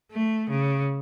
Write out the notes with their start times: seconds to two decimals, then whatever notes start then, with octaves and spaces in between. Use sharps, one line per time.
0.11 A3
0.50 C#3